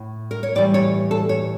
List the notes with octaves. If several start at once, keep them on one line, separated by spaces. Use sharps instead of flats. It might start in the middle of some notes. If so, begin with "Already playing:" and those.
Already playing: A2
A#4
C#5
A2 E3 G3 D5
C#5
A4
C#5